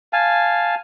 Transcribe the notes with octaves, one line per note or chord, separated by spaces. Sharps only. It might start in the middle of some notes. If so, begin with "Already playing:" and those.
F5 G#5 A5